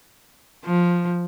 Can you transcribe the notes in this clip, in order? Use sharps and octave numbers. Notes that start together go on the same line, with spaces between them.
F3